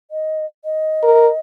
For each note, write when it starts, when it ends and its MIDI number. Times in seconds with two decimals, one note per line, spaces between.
0.11 0.45 75
0.65 1.39 75
1.03 1.29 70